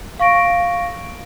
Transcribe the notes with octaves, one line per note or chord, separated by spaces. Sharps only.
F5 C#6 A#6 D7